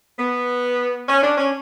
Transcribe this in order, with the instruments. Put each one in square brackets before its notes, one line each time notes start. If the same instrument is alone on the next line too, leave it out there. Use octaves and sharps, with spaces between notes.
[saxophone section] B3
C#4
D4
C#4